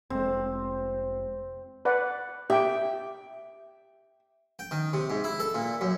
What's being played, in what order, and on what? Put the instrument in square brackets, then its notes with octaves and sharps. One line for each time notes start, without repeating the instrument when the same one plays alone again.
[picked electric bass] F1 G#3 [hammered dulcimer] C4
[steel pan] B4 D5 F#5
[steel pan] G4 G5 [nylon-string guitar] E5
[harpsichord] G5
D#3
C3
G#2
E4
A4
A#2
F#2